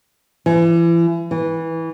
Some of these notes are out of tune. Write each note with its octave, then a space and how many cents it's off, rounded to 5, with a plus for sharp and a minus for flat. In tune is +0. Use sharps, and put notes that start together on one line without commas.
E3 +35
E3 -15